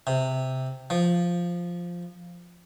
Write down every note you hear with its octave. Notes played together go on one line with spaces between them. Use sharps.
C3
F3